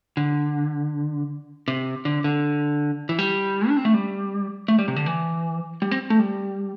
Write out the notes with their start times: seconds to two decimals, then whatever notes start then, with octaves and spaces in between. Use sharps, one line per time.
0.17 D3
1.68 C3
2.05 D3
2.24 D3
3.09 E3
3.19 G3
3.69 D4
3.77 C4
3.85 A3
3.94 G3
4.68 A3
4.79 G3
4.88 C3
4.96 D3
5.06 E3
5.82 G3
5.91 C4
6.10 A3
6.19 G3